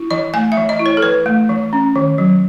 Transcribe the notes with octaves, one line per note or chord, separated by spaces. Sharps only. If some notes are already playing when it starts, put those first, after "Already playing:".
Already playing: E4
E3 D#5
A3 G#5
E5
E3
D#5
E4
C#5
A4
E3 B4
A3
E3
C#4
D#3
F#3